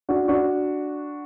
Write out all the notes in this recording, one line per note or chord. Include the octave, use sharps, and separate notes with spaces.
D4 F#4
D4 F#4